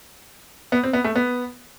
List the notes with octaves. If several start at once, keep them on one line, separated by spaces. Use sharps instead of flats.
B3
C4
B3
A3
B3